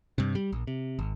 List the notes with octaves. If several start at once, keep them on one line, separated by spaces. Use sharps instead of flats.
G2 C3
G3
A#1
C3
G#1